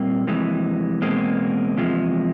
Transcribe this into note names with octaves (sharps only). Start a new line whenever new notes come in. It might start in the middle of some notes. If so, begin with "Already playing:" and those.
Already playing: A#2 G3 A#3 C4
F2 C3 E3 G#3
E2 B2 G#3 A#3 C4
E2 C3 F3 G#3